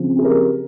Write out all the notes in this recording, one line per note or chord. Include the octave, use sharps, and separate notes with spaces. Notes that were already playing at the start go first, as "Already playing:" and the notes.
Already playing: C#3 F3 C4
G#4
G4 A#4